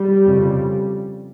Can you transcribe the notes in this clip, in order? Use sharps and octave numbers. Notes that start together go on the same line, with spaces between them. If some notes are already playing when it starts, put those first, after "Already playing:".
Already playing: G3
F2 C#3